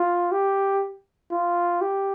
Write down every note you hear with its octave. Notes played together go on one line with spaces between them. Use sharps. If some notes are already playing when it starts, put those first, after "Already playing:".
Already playing: F4
G4
F4
G4